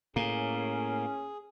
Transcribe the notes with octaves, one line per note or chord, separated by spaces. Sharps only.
A2 A#3 C#4 G#4